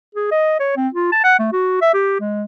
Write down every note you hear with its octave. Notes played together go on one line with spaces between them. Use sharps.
G#4
D#5
C#5
C4
F4
A5
F#5
A3
F#4
E5
G4
G#3